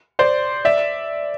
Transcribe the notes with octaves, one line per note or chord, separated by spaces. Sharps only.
C5 D5
D5 E5